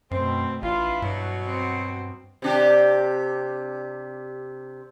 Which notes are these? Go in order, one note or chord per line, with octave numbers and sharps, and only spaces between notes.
F#2 B2 A3 C4
A1 D4 E4 F4 B4
G2 B2 F#3
C4
C3 D4 G4